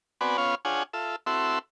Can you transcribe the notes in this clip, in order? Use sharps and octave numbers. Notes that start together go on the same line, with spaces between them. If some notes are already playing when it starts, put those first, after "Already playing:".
B3 C4 F#4 B4 D5 G#5
B3 C#4 F4 C#5 F5
D4 F4 G#4 C#5 F#5 G#5
F4 A4 E5
C4 E4 F#4 A4 E5 C6